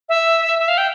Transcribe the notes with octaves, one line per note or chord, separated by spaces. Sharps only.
E5
E5
F5
G5